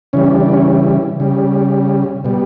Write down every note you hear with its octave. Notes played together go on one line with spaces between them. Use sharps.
C#3 E3 G3 C#4
D4
D4
C#4
C#3 G3
B2 G3